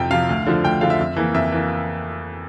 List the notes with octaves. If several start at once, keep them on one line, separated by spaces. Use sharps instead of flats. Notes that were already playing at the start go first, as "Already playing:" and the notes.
Already playing: F2 C3 F3 G5
C3 F3 F5
D2
D3 F3
D2 G5
D3 F3 F5
E5
F2
E3 A#3
F2 E5
E3 A#3